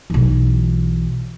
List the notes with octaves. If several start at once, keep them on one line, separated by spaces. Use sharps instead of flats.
B1 E3